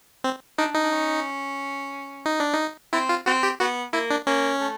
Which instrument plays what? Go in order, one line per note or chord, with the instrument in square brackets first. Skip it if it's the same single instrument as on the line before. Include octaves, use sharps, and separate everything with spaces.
[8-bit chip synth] C4
[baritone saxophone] D4 [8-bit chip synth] D#4
[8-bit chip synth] D#4
[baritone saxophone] D4
C#4
[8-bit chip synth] D#4
D4
D#4
[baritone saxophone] C4 [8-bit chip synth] E4
[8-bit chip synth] F4
[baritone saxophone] C4 [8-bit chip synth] F#4
[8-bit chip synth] G4
[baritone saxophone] B3 [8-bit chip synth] F#4
[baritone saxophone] A#3 [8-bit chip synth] E4
[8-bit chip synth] D4
[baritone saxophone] A#3 [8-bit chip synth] C#4
[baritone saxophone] A3